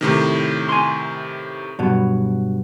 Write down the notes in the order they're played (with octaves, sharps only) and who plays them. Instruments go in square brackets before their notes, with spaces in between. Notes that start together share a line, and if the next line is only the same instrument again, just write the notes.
[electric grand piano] A2 C3 D#3
[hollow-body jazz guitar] G#5 C6
G2 B2 F#3